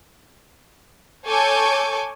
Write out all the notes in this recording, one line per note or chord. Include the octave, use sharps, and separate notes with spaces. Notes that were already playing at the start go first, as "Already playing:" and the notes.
A4 C#5 G#5 C#6 D6 G6